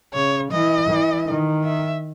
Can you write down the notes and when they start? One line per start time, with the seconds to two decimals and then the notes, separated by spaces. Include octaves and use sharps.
0.14 C#3 C#5
0.51 E3 D#5
0.89 E3
1.28 D#3
1.65 E5